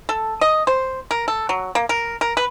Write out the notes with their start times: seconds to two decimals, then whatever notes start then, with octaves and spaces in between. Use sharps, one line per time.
0.09 A4
0.41 D#5
0.67 C5
1.11 A#4
1.28 A4
1.49 F#3
1.75 A#3
1.89 A#4
2.21 A#4
2.37 B4